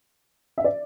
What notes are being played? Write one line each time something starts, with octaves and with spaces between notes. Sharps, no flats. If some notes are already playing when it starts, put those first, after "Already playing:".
E5
D5